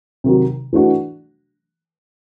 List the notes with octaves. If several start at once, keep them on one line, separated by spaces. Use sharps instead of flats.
C3 D#3 F#3
E3 A3 D4 F#4